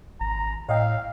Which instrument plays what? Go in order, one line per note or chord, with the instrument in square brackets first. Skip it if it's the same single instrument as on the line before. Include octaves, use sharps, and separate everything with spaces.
[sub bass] G#1 [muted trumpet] A#5
[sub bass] A2 [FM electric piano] C#5 D#5 G5 [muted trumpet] F5